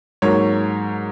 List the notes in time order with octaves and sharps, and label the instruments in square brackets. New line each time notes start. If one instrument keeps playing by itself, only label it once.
[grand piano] G#2 F#3 A#3 C#5